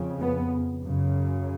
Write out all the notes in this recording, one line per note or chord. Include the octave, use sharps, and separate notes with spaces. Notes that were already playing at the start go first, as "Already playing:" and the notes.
Already playing: F2 C#3
B3
F#2 C#3